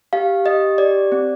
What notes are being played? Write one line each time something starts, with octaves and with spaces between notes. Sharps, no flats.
G4 F5
G4 D#5
G4 D5
C4